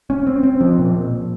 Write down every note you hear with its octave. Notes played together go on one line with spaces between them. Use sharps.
C#4
C4
C4
F3
A#2